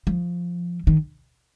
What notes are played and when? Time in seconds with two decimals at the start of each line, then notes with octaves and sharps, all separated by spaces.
0.07 F3
0.87 D#3